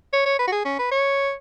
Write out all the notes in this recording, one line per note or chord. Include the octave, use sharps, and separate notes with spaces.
C#5
C#5
B4
F#4
G#4
C#4
B4
C#5